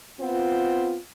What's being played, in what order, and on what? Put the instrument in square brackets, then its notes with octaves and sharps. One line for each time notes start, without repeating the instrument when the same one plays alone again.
[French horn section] B3 C4 F4